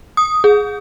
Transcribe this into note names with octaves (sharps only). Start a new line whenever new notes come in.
D#6
G#4